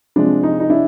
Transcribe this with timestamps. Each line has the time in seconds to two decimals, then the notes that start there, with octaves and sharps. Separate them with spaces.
0.16 C3 F3 G#3 D4
0.43 D#4
0.60 D#4
0.70 D4 E4